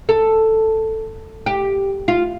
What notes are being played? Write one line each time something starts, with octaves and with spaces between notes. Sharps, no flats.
A4
G4
F4